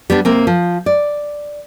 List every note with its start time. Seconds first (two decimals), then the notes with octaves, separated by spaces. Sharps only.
0.10 G3 B3 D4
0.25 C3 A#3 C4
0.47 F3
0.86 D5